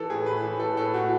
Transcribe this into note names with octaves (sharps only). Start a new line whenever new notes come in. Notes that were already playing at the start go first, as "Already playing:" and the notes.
Already playing: E3 A4
A2 G#4
A2 B4
E3
E3 A4
A2 A4
A2 F#4